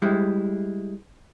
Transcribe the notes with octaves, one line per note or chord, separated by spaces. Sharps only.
G3 G#3 E4